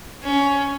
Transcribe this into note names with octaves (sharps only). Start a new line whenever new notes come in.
C#4